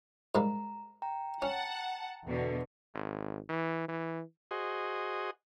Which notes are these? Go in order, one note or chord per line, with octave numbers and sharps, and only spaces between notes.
G#2 G3 A#3 A#5
G5 A#5
C#4 F#5 A5
E2 B2 D3
G#1
E3
E3
F#4 G#4 C5 D#5